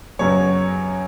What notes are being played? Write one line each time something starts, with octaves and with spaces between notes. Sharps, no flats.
F#2 C#3 F#3 B3 C#5